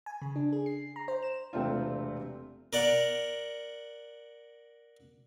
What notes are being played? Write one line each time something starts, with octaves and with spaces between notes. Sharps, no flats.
G#5
C#3
D4
G#4
C7
A#5
C5
E7
E1 C3 A3 C4 D4 F4
A#4 D5 F#5